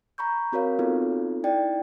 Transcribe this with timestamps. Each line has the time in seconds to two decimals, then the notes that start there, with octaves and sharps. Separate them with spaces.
0.18 A#5 B5 C#6 G6
0.52 C4 F#4 A#4 C#5 F5
0.79 B3 C4 D#4 F4 A4
1.44 D#4 E4 D5 G5